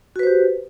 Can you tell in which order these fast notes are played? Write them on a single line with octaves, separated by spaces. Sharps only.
F#4 B4 C5 G4